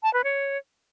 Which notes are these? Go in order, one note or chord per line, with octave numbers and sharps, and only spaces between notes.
A5
B4
C#5